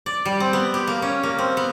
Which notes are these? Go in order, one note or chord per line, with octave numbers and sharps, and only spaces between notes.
D5
G3
C4
B3
G4
A#3
C#4
A#3
C4
B3